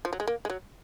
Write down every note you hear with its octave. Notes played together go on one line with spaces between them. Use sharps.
F3
F#3
G#3
A#3
G#3
F#3